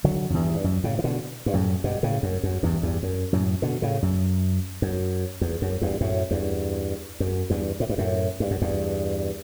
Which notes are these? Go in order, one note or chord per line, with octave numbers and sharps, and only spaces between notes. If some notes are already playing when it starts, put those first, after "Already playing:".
D3 F#3
F#2
E2 G2
G2
F#2
A2 C#3
E3
B2 D3
G2
F#2 A2
G2 B2
A2 C#3
F#2
F#2
E2 G2
E2 G2
F#2
F#2 A2
B2 D3
A2 C#3
F#2
F#2
E2
F#2
E2 G2
F#2 A2
E2 G2
F#2
E2 G2
A2
G2
F#2 A2
G2
F#2
E2 G2